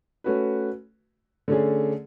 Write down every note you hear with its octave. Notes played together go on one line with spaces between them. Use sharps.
A3 C#4 F#4 B4
D3 A3 C#4 G#4